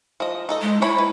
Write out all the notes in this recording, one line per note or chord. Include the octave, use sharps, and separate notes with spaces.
F3 D#5
D#4 A4 D#5
G#3
A3 E4 C#5 B5
B4